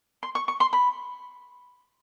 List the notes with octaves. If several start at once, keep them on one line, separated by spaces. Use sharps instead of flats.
C6
C#6
C#6
C6
B5